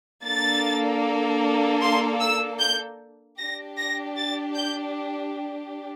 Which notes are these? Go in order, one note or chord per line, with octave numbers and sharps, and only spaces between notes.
A#3 D4 A4 A6
C6
E6
G6
D4 G4 A#6
A#6
A6
G6